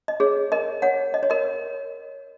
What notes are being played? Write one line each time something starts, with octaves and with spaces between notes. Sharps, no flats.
D#5
G#4 C#5
A#4 D#5
C#5 F#5
D#5
C#5
A#4 D#5